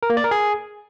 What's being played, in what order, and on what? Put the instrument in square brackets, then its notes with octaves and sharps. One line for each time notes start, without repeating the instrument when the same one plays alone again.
[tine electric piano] A#4
A#3
D5
A#4
G#4